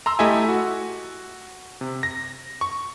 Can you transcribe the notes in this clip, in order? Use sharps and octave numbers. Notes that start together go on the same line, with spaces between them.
A#5 C6 E6
A3 E4 G4 D#5 E5 G#5
F#4
C3
A#6
C#6